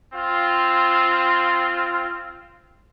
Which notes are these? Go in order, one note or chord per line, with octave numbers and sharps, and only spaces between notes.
C4 F4